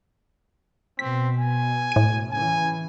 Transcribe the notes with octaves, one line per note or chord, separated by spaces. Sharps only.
B2 C4 B6
G#5
A2 D#7
C#3 E3 G#5